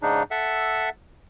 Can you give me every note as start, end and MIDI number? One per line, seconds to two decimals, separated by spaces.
0.02 0.23 44
0.02 0.23 49
0.02 0.23 62
0.02 0.23 63
0.31 0.89 69
0.31 0.89 76
0.31 0.89 78